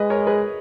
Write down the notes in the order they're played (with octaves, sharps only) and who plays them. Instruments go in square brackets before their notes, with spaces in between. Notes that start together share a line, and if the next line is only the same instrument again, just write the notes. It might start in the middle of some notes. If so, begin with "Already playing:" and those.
Already playing: [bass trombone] G#3 [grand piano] B4 D#5
[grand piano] A#4 C#5
G#4 B4